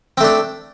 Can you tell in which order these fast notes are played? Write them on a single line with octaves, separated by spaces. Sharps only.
C4 A3 D4